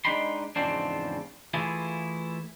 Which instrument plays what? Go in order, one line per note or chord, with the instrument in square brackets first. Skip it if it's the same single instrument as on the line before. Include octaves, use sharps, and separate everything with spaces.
[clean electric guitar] G#3 D4 D#4 G5 B5 C6
E2 G#2 C#3 F3 C4 D4
E3 A3 E4 F4 G#4